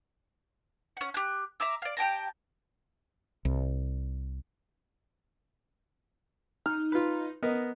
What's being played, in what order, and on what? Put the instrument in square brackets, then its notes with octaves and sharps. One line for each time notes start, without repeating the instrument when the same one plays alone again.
[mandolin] C#4 F#5
G4 F#6
E5 A#5 D6 E6
D5 F5
G4 G5 A5 A#5
[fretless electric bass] C2
[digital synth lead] D#4 [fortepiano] F6
[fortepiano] F4 B4
B3 A#4 D#5